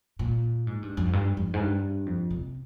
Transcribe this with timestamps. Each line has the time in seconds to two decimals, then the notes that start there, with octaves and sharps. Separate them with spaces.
0.19 A#2
0.67 G#2
0.83 G2
0.97 F2
1.13 G2
1.37 F2
1.54 G#2
1.60 G2
2.06 F2
2.31 C3